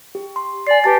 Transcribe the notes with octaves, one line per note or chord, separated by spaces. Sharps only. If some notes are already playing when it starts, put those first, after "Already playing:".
G4
C6
D5 G#5 C7
G4 B4 A5 A6